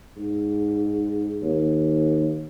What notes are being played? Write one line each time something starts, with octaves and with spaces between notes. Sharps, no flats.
G#2
D#2